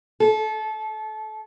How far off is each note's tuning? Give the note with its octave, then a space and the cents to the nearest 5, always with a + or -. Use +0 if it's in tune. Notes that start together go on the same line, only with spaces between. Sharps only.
A4 -25